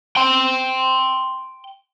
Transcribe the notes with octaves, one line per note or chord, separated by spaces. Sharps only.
G5 C6